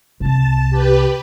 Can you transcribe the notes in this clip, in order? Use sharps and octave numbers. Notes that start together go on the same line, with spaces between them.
C2 C3 A5
G4 B4